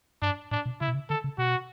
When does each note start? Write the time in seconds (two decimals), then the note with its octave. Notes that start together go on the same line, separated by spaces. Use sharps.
0.22 G2 D4
0.51 A2 D4
0.66 B2
0.81 C#3 E4
0.88 B2
0.94 C#3
1.09 D3 A4
1.24 C#3
1.38 B2 F#4